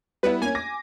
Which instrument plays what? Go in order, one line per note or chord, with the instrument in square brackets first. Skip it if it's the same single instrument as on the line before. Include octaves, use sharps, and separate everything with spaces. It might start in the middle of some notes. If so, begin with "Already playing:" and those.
[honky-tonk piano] G3 B3 E4 [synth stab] B4
[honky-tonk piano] A#3 C#4 [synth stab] G#5
[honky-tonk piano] D6 A#6